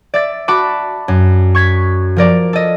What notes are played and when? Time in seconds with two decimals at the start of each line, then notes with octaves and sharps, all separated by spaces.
0.14 D5 E5 A6
0.48 F#4 A5 B5 D6
1.08 F#2
1.55 C#6 G#6 B6
2.16 F3 A#4 D5
2.53 A4 D#5